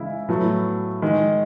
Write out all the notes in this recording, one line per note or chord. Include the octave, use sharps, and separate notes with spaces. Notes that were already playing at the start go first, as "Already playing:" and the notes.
Already playing: C#3 E3 G#3 D#4 E4
A2 F#3 A3 B3
D#3 G#3